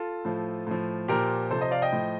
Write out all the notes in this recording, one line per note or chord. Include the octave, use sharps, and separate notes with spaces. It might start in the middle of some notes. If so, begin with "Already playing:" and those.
Already playing: F4 A4
A2 F3
A2 F3
A#2 F3 G4 A#4
C3 F3 A4 C5
C5 D#5
D5 F5
D#5 G5
A2 F3